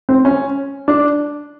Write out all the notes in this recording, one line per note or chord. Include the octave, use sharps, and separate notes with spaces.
C4
C#4
D4